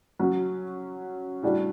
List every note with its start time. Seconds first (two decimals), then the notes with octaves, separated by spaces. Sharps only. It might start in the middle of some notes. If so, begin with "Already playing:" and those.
0.19 F#3 C#4 F#4
1.43 A2 G3 D4 F#4